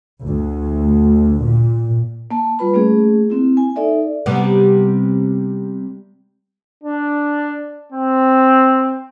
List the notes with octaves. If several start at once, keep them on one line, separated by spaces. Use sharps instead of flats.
D2
A#2
A#3 A5
G3 F4 B4 B5
A3 A#3 C#4 G#4
A#3 C4 E4
G#5
D#4 A4 D5 E5
C3 G3 B3
D4
C4